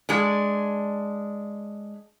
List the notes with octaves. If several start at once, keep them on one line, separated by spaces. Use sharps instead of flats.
G#3 D4